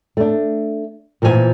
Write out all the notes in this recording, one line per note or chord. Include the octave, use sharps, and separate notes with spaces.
A3 D4
A#2 E3 F3 B4 G#5